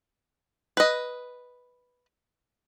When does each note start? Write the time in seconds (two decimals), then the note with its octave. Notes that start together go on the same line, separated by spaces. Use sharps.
0.77 B4 D#5